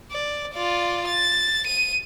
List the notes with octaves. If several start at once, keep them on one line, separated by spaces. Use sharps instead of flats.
D5
F4 D5
A6
D#7